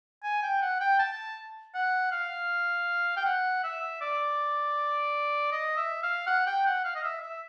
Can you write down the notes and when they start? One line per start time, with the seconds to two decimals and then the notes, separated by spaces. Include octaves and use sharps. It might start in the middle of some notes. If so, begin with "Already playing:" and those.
0.23 G#5
0.43 G5
0.62 F#5
0.80 G5
0.99 A5
1.75 F#5
2.12 F5
3.17 G5
3.26 F#5
3.63 E5
4.01 D5
5.52 D#5
5.77 E5
6.03 F5
6.27 F#5
6.46 G5
6.66 F#5
6.84 F5
6.95 D#5
7.04 E5
7.22 E5